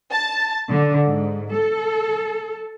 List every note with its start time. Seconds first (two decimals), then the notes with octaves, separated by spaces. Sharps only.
0.12 A5
0.71 D3
1.07 G#2
1.53 A4